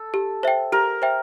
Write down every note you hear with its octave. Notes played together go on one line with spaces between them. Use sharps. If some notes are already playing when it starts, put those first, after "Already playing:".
Already playing: A4
G4
C5 E5 G5
G4 A#4
C5 E5 G5